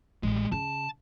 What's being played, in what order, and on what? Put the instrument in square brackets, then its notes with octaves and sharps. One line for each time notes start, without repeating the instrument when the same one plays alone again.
[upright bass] A1 [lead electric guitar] G3 G#3
[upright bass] C#3 C#4 [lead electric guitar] A5